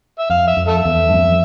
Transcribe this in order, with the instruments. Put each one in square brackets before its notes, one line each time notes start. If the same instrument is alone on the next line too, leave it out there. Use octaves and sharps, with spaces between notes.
[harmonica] E5
[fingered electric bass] F2 [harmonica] F5
[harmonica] E5
[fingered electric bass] F2
[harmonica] A4 E5
[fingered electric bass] E2
G2
F2